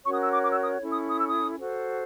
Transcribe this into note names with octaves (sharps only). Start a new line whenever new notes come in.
C#4 F#4 A#4 C#5 C#6
D#6
E6
D6
D6
E6
D#6
C#4 E4 A4
D#6
D#6
E6
D#6
F#4 A4 C5